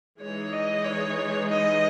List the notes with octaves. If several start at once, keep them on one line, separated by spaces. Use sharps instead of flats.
E3 G#3 D#4 G#4 C#5
D#5
C#5
D#5